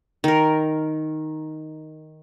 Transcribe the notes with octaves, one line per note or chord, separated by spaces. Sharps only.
D#3 A#4